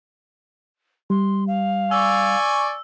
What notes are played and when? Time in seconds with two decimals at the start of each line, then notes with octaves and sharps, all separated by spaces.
1.10 G3 C6
1.47 F5
1.91 D5 G#5 C#6 E6